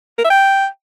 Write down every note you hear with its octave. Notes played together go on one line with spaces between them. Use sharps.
A#4
E5
G5